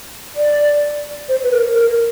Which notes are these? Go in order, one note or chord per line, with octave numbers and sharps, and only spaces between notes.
D5
C5
B4
A#4
A#4